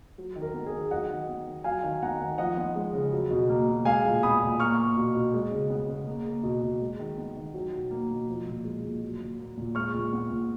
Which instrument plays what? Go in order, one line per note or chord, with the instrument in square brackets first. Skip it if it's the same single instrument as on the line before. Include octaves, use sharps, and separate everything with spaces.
[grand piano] F#3
D#3
A#4
B3
G#4
D#3
F#3 D#5 F#5
D#3
B3
D#3
F#3 F5 G#5
D#3
B3 F#5 A#5
D#3
F3 D#5 F#5
B3
G#3
C#3
F#3
B2
A#3
B2
G#3 F5 G#5
A#2
B3 B5 D#6
A#2
A#3 C#6 F6
A#3
B2
B2
G#3
C#3
B3
C#3
A#3
A#3
B2
B2
G#3
D#3
B3
D#3
F#3
B2
A#3
B2
F3
A#2
G#3
A#2
F#3
A#2
A#3
A#2
G#3 C#6 F6
A#2
B3
A#2